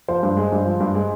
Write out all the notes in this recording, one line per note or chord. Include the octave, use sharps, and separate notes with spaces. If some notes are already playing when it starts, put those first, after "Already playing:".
F3 C5
G2
G#3
G2
F3
G2
G#3